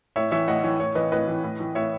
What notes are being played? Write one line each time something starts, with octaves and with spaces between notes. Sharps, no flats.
A2 C#5 E5
E3 C#5 E5
A2 D#5 F#5
E3 C#5
A2 C#5
E3 B4 D#5
A2 B4 D#5
E3
A2
E3
A2 C#5 E5